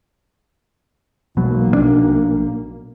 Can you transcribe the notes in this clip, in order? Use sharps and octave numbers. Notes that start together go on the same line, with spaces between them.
E1 B1 B2 F#3 A#3
A#1 D3 D4